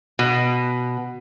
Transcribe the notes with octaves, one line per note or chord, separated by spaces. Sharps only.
B2